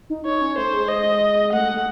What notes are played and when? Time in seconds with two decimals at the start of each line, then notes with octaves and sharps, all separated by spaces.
0.10 D#4
0.26 D#4 C#5
0.41 C#4
0.58 A3 C5
0.73 G#3
0.89 D#5
1.53 A3 F#5
1.74 A3